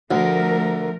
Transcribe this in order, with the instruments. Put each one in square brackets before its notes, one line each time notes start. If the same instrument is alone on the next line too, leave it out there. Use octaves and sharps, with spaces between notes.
[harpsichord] D2 [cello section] F3 A3 A#4